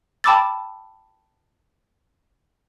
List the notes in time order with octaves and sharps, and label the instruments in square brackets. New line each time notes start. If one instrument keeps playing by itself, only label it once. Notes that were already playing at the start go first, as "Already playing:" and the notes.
[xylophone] G5 A5 B5 D6 E6 A6